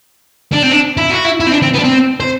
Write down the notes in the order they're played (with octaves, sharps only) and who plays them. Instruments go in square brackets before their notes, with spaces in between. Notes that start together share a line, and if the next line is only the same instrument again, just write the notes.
[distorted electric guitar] D4
C4
D4
E4
F#4
E4
E4
C4
D4
C4
B3
D4
C4
C5